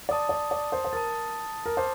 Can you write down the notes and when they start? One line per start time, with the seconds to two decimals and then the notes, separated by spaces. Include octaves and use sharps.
0.09 D5 A5 D#6 A6
0.29 D5
0.51 D5
0.72 C5
0.85 C5
0.93 A#4 A5 D#6 A6
1.66 A#4
1.76 C5 A5 D6 F6